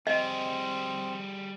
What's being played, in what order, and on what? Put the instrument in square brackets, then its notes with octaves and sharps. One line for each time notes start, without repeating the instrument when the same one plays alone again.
[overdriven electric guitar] G3 G#4 [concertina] C4 [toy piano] D#5